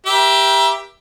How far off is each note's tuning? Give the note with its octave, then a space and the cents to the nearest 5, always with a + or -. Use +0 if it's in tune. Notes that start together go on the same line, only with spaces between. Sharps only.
G4 +0 A#4 +45 E5 +10